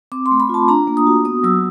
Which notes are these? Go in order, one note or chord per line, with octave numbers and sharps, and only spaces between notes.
C4 D6
C6
A3
B5
F4 A5
D4 A#5
A#3
D#6
F#4
B3 D#6
F#3 E6